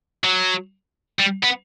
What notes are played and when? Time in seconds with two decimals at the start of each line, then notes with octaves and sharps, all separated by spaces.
0.24 F#3
1.20 G3
1.44 B3